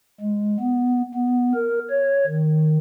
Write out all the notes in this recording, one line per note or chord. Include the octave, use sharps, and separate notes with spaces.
G#3
B3
B3
A#4
C#5
D#3